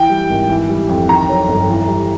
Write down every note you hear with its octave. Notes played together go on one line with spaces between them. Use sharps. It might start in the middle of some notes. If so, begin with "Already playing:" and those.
Already playing: E3 G5
G3
G#1
E3
G3
F2
D#3 A#5
F#3
G1
E3
G3